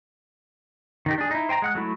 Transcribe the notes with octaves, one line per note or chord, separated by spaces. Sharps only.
D#3 D#4 G4
D4 G#4
D#4 E4
C5 G5 G#5 A#5
G#3 F#5 F#6
F#3 A3 E4